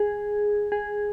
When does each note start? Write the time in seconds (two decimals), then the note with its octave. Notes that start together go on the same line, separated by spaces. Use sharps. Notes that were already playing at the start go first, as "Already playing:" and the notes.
Already playing: G#4
0.72 G#4